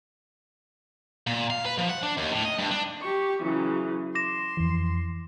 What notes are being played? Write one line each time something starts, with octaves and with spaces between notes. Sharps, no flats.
A#2
F5
B4
F3
F#5
D4
D#2
A2
D#5
G2
D4
G4 C#6
C#3 E3 F#3
C6 D6 A#6 E7
F2 E3